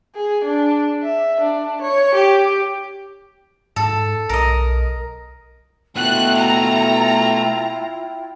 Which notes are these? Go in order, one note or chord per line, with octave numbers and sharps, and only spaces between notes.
G#4
D4
E5
D4
C#5
G4
G#2 A4
B1 A#4 D#5
B2 A3 E4 F4 F#5 G5 F#6
A#5